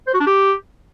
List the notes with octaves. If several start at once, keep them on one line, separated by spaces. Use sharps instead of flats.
C5
F#4
D4
G4